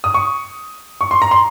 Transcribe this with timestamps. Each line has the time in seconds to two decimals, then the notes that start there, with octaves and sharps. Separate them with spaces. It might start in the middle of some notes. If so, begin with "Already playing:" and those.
0.04 D#6
0.14 C#6
1.01 C#6
1.11 C6
1.22 A#5
1.31 C6